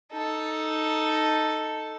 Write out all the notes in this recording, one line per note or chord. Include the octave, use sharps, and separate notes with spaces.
D#4 A4